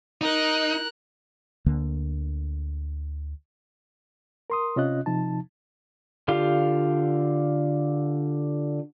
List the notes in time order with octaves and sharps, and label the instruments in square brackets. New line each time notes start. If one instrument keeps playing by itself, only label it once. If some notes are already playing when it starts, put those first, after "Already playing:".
[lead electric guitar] D#4 [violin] A#4 F#6
[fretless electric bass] D2 D3 A#3
[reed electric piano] A#4 C6 D#6
C3 C#4 F4 D#5 F#6
C3 F3 D#4 A5
[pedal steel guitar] D3 F4 G4 F5